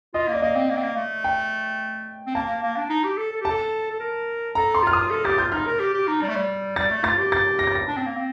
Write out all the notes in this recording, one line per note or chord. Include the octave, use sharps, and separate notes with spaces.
F4 D#5
A#3
D5
A#3 D#5
C4
A#3
C4
A#3
A3
G5
C4
A#3 A5
A#3
A#3
D4
D#4
G4
A4
A4
G4
A4 A5
A4
A#4
A4 A#5
C6
F4 F6
D#6
A4
G4 A6
F4 G6
D#4 F6
A#4
G4
G4
D#4
G3
A3
G3
G3 A6
A3
F4 A6
G4
A6
A#6
A6
A#6
D4
C4
A#3
C4